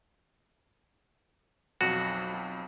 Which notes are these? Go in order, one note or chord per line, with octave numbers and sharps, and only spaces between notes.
B1 F2 F#4